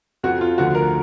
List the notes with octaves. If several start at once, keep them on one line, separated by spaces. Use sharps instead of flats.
F2 F3 F#4
F4
D2 D3 F3 F#4
A#4